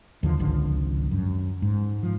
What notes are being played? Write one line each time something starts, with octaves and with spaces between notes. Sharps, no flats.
D#2 D3 F3
G#1 C#2 D3 F3
F#2
G#2
F3